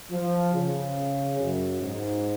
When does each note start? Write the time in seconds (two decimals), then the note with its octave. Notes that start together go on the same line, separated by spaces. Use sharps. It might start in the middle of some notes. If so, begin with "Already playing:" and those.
0.11 F3
0.54 C#3
1.39 F#2
1.81 G#2